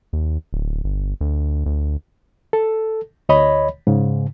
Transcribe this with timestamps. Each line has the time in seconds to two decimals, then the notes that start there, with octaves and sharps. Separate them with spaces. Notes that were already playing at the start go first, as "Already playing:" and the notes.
0.13 D#2
0.53 D1
0.84 G1
1.21 D2
1.66 D2
2.53 A4
3.29 D2 C#5 D#5 B5
3.87 G#2 C#3